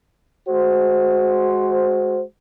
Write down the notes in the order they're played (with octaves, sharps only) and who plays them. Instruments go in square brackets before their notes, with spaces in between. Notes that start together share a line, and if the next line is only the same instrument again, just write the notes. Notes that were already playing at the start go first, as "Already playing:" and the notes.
[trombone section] G#3 F#4 C5